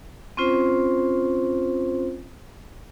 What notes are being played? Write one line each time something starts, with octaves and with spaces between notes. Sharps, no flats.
C4 C#4 F4 C5